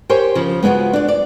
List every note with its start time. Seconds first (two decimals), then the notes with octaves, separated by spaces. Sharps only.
0.09 G4 A#4 C5 C#5 G#5
0.35 C#3 F3
0.63 G#3 B3 D#4 F4 F#4
0.93 D4 D5
1.08 D5